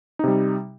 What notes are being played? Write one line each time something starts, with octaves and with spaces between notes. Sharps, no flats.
C3 G3 D#4